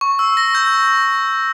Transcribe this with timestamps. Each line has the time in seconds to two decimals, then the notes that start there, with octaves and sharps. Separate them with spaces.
0.01 C#6
0.19 E6
0.37 A#6
0.55 G6